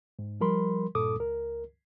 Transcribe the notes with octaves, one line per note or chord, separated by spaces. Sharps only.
G#2
F3 G3 A#4 B5 C6
G2 A#2 A4 D6 D#6
C#2 A#4